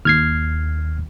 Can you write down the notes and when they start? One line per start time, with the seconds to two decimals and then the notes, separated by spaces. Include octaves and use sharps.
0.05 D#2 F6 G#6 C7